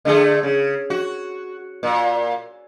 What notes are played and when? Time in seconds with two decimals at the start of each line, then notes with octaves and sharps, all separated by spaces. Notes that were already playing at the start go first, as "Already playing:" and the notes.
0.05 D3 A3 G#4
0.43 C#3
0.90 F#4
1.83 A#2